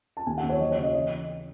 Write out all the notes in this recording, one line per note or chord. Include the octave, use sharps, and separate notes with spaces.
A5
D#2 G#5
F#5
D#2
C#5
F#3 D#5
C#5
C#3
D#5
E3 D#5